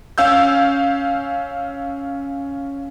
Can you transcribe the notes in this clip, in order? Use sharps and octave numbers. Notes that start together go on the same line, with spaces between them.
C#4 F5 E6 G6